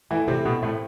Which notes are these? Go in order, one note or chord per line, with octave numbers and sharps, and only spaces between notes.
E3 A3 E4
C3 C4 E4
B2 B3 C4
A2 A3 C4